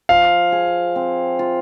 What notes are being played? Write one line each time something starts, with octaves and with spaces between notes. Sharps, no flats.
F3 F5
G#4
C4
F4